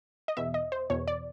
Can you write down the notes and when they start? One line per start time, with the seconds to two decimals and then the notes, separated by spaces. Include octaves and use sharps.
0.28 D#5
0.37 E2 B2 E5
0.54 D#5
0.72 C5
0.90 E2 B2 C#5
1.08 D5